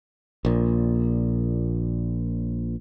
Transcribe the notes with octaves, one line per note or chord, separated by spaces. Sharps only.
A#1 A#2